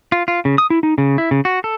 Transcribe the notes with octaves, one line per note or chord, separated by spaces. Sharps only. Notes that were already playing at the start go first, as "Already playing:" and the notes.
F4
F4
C#3
D#6
E4
D#4
C#3
E4
C#3
F#4
A4